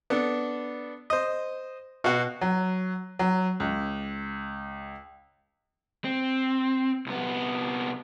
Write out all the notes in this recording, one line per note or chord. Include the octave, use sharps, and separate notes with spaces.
B3 D4 A4
C5 D#5
B2 F#4
F#3
F#3
C#2
C4
C2 B3